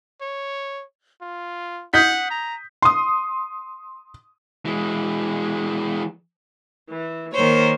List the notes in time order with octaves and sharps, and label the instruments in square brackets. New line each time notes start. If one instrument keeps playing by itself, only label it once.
[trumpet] C#5
F4
[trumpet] F#5 [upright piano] D#6 G6 B6
[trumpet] A#5
[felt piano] C6 D#6
[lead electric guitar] E3 G#3
[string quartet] E3
D#3 A#3 C5 C#5